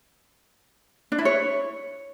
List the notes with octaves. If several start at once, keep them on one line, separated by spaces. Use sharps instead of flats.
D4
E4
C#5